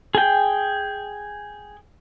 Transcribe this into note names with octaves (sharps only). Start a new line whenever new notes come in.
G#4 G5